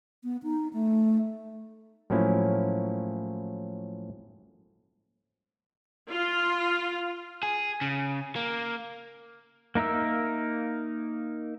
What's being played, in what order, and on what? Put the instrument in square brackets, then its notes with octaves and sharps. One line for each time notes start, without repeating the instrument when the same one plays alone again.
[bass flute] B3
D#4
A3
[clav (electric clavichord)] A2 F3 F#3 A#3 C#4 E4
[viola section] F4
[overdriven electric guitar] G#4
C#3
A#3
[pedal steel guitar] A#3 D#4 A#4 E5 E6